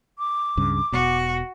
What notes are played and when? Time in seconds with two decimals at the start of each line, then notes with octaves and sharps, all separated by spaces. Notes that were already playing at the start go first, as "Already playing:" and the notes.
0.18 D6
0.57 C#2 G2 C#3
0.92 E1 B2 F#4